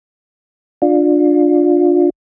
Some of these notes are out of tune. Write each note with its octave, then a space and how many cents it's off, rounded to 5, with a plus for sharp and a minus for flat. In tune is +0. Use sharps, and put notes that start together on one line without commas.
D4 +10 F4 +25